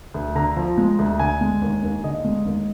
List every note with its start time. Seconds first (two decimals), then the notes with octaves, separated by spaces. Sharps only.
0.14 D2
0.35 D3 A#5
0.56 F3
0.78 G#3
0.99 D2
1.19 D3 G#5
1.41 G#3
1.62 D#2
1.83 D#2
2.04 D3 D#5
2.25 G#3
2.46 D#2